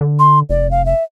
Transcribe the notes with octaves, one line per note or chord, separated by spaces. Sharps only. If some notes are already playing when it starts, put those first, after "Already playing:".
D3
C6
F1 D5
F5
E5